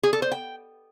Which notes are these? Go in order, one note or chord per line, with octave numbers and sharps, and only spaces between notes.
G#4
A4
C5
G5